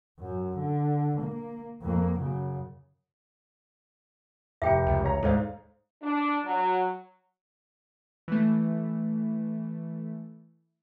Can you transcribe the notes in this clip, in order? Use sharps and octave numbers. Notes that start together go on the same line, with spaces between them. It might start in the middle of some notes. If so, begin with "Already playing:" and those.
F#2
D3
A#3
F2 A#3
F#2 C#3
F1 G4 E5 G5 C#7
C#2
C#5 A#5
D#2 G#2 A4 C5 D5 F5
D4
F#3
E3 A3